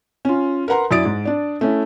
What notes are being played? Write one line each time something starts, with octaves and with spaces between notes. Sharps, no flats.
C#4 F4
A#4 B4 F#5 A#5 C6
F#2 E4 D5 D#6 A6 D7
G#2
D4 D5
A3 C#4 E4